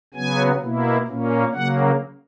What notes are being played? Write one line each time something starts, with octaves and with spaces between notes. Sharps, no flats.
C#3 F#3 B3 G#5
B2 A#3 E4
A#2 A#3 C#4
C#3 F#3 A#3 F#5